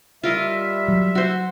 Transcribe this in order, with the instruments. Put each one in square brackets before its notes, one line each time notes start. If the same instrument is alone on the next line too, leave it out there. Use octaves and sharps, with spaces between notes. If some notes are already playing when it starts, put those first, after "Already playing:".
[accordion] G3 E5 [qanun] F4 A#4 D#5
[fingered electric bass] F#3
[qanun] F#4 C5